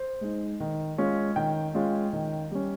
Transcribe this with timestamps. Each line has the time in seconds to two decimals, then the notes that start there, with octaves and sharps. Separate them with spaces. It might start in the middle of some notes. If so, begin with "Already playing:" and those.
Already playing: C5
0.21 G#3 D#4
0.60 D#3
0.98 G#3 C#4 F4
1.36 D#3 G5
1.74 G#3 C#4 F4
2.13 D#3
2.51 G3 C#4